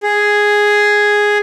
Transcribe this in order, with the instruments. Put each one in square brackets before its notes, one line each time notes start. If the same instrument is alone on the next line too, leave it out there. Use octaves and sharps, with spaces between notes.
[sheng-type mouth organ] G#4